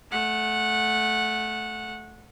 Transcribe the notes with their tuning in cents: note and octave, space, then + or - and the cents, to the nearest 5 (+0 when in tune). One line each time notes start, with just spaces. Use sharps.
A3 -20 F#5 -10